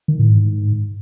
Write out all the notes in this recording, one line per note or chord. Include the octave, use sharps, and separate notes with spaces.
D#3
A2
G#2